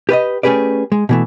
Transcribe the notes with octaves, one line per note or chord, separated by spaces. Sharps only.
G4 B4 D5 D#5
A3 C#4 G4 G#4 B4 D5
G#3
B2 E3 A3